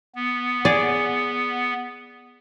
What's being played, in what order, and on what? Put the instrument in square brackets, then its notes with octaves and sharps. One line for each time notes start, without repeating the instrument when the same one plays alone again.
[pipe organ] B3
[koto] G#4 D5